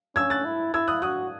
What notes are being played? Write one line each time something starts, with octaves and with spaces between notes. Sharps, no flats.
C#4 E6 G#6
F#6 A6
E4
E4 E6 G#6
D#6 F#6
F#4 D#6 F#6